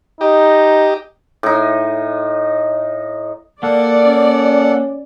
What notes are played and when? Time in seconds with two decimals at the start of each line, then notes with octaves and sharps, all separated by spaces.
0.21 D#4 G4 D#5
1.43 A2 D#4
3.63 A#3 A4 D5 F#5
4.05 C#4